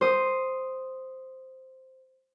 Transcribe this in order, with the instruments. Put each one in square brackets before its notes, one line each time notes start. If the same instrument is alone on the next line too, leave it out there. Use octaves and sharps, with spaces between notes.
[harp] C5 D#6